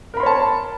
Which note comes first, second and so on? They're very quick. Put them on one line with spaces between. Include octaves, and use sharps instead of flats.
A#4 B5 C6 C#5 A5